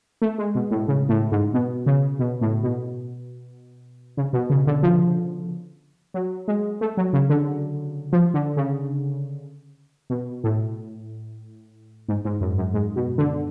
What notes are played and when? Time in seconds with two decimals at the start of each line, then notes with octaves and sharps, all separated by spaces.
0.22 A3
0.38 G#3
0.55 B2
0.71 A2
0.88 C#3
1.09 A2
1.32 G#2
1.54 B2
1.86 C#3
2.19 B2
2.41 A2
2.63 B2
4.17 C#3
4.33 B2
4.50 C#3
4.67 D3
4.83 F3
6.14 F#3
6.48 G#3
6.81 A3
6.97 F#3
7.13 C#3
7.30 D3
8.12 F3
8.34 D3
8.57 C#3
10.10 B2
10.44 A2
12.08 G#2
12.25 G#2
12.41 F#2
12.58 F#2
12.74 G#2
12.96 B2
13.18 D3